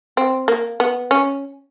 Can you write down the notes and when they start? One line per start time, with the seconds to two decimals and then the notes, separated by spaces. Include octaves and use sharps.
0.17 C4
0.48 A#3
0.80 B3
1.11 C#4